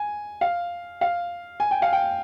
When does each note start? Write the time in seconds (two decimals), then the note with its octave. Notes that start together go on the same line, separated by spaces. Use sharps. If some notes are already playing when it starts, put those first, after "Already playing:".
Already playing: G#5
0.41 F5
1.01 F5
1.60 G#5
1.71 G5
1.82 F5
1.93 G5